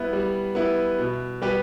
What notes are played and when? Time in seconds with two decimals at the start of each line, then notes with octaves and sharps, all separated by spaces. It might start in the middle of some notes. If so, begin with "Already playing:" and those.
Already playing: G3 B3 E4 B4
0.13 G3
0.55 B3 E4 B4
0.99 B2
1.42 G3 B3 G4 B4